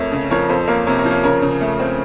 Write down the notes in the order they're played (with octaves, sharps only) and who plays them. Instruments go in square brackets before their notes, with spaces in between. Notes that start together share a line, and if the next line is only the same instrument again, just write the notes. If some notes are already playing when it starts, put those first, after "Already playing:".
Already playing: [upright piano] F2 A3 [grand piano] A#4 C#5
[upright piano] C#3
[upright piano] F3 [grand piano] A#4 C#5
[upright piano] F2 [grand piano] A4 C5
[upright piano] A#3 [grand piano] A#4 C#5
[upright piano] C3 [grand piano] A#4 C#5
[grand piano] A#4 C#5
[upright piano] F3
[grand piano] A#4 C#5
[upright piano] C#3 [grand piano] A#4 C#5
[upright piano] C#3
A3
C4